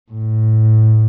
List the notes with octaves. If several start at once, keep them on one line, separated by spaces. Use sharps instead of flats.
A2